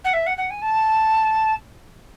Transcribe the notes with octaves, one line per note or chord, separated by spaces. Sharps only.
F#5
E5
F#5
F#5
G#5
A5